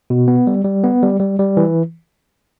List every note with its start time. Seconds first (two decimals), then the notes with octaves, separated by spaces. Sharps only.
0.10 B2
0.28 B3
0.47 G3
0.65 G3
0.84 B3
1.02 G3
1.20 G3
1.39 G3
1.57 E3